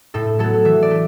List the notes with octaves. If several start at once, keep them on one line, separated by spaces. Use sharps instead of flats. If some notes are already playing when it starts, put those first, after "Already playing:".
A2 A4
F#3 B3 A4
E3 E5
D5
A3